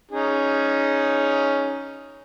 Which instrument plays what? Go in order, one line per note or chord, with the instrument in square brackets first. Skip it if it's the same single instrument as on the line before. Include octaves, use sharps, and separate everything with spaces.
[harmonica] C#4 D#4 G#4